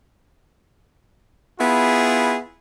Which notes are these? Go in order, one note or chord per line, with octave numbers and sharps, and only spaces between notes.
B3 E4 F4 G#4